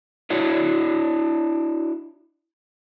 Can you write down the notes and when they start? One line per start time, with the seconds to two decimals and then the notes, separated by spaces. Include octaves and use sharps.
0.30 D4 E4 F#4 C#5